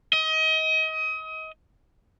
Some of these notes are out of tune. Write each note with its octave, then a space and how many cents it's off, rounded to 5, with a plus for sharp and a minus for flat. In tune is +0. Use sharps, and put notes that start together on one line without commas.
D#5 +30